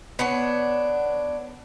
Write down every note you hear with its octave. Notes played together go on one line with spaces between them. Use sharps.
B3 D4 C#5